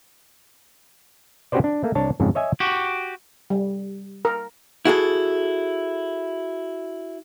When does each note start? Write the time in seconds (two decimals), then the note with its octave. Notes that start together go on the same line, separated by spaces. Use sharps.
1.52 C#4 F#4 G4 B4 C5 D5
1.64 D4
1.84 A3 A#3
1.95 C2 D4 C#5 A5
2.20 F2 G#2 C#3
2.35 C#5 D#5 E5 G#5
2.60 F#4 G4
3.50 G3
4.25 A#4
4.85 E4 F#4 G#4 A4